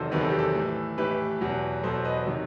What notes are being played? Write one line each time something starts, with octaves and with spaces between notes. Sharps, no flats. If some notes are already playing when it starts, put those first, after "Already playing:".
Already playing: E2 C3 D#3 F#3 A4 C5 D#5
E2 C3 D#3 F#3 B4
A4
G4
A4
A2 E3
A2 E3 G4 B4
E2 B2 F#3
E2 B2 F#3 A4 C5
B4 D#5
C3 D#3 F#3